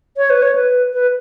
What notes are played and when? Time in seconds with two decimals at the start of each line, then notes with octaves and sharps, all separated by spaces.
0.17 C#5
0.30 B4
0.42 C#5
0.55 B4
0.94 B4